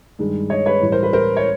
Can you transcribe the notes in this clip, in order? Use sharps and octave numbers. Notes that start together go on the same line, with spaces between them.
G2 D#3 G#3
C#5 D#5
B4 C#5
A2 E3 G3
A#4 C5
B4
A#4 C5
C#5